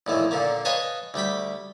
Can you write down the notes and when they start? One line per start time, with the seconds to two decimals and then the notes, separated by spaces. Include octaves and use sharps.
0.07 A#1 A2 D#3 E3
0.31 A#2 D3 F3 A#3
0.65 B4 C#5 D#5 F5 G#5 A5
1.14 D2 G3 G5 B5